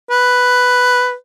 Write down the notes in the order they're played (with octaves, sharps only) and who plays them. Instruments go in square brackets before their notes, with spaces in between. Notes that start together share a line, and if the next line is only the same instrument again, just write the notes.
[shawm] B4